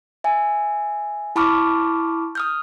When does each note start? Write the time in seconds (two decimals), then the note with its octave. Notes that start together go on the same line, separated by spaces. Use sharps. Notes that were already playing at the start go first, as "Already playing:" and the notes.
0.24 E5 G#5
1.36 E4 A5 B5 C#6 D6 F6
2.35 D#6 F6 G6